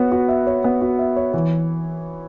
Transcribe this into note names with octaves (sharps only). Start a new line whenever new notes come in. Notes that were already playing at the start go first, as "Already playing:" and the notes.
Already playing: B3 F#4 C#5
F#4
E5
C#5
B3
F#4
E5
C#5
E3